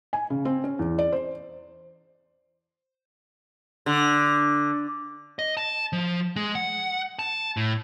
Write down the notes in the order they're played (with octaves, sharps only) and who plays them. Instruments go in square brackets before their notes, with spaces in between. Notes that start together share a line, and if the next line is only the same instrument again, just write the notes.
[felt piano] G#5
C#3
C4
C#4
E2
D5
C5
[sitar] D3
[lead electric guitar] D#5
A5
F3
G#3
F#5
A5
A2